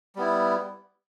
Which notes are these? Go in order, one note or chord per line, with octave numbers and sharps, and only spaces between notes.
G3 B3 E4